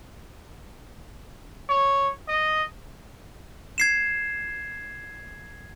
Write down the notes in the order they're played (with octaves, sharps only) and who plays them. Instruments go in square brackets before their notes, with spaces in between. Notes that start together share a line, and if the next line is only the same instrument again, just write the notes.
[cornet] C#5
D#5
[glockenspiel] G#6 C7 E7